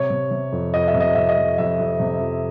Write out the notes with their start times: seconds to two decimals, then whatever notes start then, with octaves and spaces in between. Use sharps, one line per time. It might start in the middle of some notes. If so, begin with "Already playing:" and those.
Already playing: C3 C#5
0.10 C3
0.31 C3
0.52 F2
0.74 F2 D#5
0.88 E5
0.94 C3
1.01 D#5
1.15 C3 E5
1.29 D#5
1.37 F2
1.58 F2 E5
1.80 F2
2.00 C3
2.20 F2